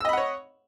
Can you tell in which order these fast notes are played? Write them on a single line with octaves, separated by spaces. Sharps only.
E6 D#5 B5 F#5 C#5